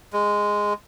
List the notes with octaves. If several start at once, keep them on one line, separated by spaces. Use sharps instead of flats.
G#3